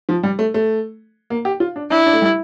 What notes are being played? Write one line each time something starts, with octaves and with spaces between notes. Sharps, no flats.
F3
G3
A3
A3
A#3
G4
F4
D4
D4 E4
D4
A3
G3